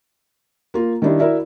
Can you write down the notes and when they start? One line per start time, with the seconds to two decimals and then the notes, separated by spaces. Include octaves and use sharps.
0.74 A#3 F4
1.02 D#3 G3 D4 E4
1.19 E4 F#4 A#4 D5 E5